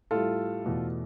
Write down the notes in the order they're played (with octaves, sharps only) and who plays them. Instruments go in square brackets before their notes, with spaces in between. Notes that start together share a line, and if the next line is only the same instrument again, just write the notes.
[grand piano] A2 G3 F4 A4
E2 B2 A3